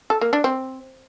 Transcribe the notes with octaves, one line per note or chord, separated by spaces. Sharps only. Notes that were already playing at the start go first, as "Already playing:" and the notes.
A4
A#3
D4
C4